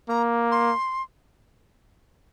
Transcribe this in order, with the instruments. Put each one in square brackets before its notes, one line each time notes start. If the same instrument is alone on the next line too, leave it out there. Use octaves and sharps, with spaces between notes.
[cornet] A#3 [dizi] A#5
[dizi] C6